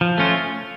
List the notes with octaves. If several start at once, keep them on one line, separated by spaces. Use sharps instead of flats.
F3
A3 C#4 F4